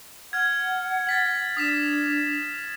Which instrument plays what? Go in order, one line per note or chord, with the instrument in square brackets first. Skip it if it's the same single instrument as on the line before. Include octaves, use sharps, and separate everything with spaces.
[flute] F#5 [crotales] F6 G#6
[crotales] A6 B6 F#7
[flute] D4 [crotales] D#6 B6 E7